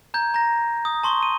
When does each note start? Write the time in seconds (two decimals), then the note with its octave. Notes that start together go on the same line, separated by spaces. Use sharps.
0.14 A#5 G6 G#6
0.34 A#5 A#6
0.85 D#6
1.03 A5 C6 C#6 G7
1.23 D#7